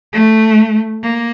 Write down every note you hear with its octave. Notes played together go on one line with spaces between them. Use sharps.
A3
A#3